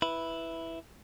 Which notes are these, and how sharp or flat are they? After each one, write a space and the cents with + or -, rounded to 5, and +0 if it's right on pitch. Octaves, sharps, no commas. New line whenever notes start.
E4 +0 B4 +0